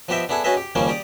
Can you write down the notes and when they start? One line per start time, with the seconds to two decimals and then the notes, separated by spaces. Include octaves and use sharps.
0.09 F3 B3 G4 D#5 E5 G5
0.29 B3 D4 E4 G#4 A4
0.44 C#4 F#4 G#4 B4 D#5 E5
0.57 G4
0.75 D#2 C#3 F3 G3 A#3 C#4
0.88 G4 D5 D#6